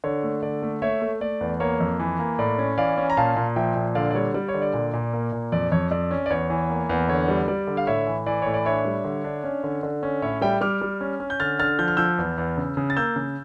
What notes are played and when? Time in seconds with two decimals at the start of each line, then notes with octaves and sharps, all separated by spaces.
0.04 D3 C#5
0.23 A3
0.42 D3 D5
0.62 A3
0.82 A3 C#5 E5
1.02 A3
1.21 A3 D5
1.41 E2
1.60 A#3 C#5
1.80 F2
1.99 E3
2.19 A#3
2.38 A2 D5
2.58 C#4
2.78 E3 D5 F5
2.98 C#4
3.10 A#5
3.17 A#2 F5 A5
3.36 A#2
3.56 F3 E5 G5
3.76 A#2
3.95 D3 D5 F5
4.11 D5
4.15 G3 C#5
4.34 G3 D5
4.48 C#5
4.54 D3
4.62 D5
4.74 A#2
4.93 A#2
5.13 A#3
5.32 A#2
5.52 F2 D5
5.72 F2 C#5
5.91 F2 D5
6.11 C#4
6.26 D5
6.30 E2 C#5
6.50 E3
6.69 A#3
6.89 E2
7.09 D3 C#5
7.28 G3
7.48 G3 D5
7.67 D3
7.77 F5
7.87 A2 C#5 E5
8.07 E3
8.26 E3 D5
8.42 A2 C#5
8.54 D5
8.65 D4 C#5 E5
8.85 G3
9.05 D3
9.24 D4
9.44 C#4
9.64 D3
9.83 D3
10.03 C#4
10.22 A2 C#5 E5
10.42 G3 E5 G5
10.61 G3 D6 F6
10.81 G3
11.01 C#4
11.20 C#4
11.30 G6
11.40 D3 F6 A6
11.59 D3 F6 A6
11.79 F3 G6
11.88 F6
11.97 F3 E6 G6
12.18 E2
12.38 E2
12.57 C#3
12.77 C#3
12.90 A6
12.97 A#3 E6 G6
13.16 C#3